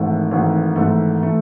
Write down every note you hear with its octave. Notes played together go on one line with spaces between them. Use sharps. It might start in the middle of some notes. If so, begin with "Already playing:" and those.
Already playing: G#1 G#2 E3 A3
G#1 G#2 E3 A3
G#1 G#2 E3 A3
E3 A3